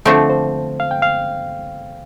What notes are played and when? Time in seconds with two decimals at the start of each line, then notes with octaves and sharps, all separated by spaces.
0.05 D3 F3 A3 C4 A4
0.30 C5
0.80 F5
0.91 G5
1.02 F5